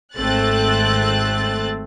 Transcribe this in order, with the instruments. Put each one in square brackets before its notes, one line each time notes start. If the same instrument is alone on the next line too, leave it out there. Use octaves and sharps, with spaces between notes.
[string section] G#1 A3 C4 F#6 A6